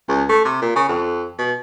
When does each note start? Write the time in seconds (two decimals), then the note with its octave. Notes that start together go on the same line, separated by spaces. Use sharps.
0.09 C#2
0.29 A3
0.45 C3
0.62 A#2
0.76 C#3
0.89 F2
1.38 B2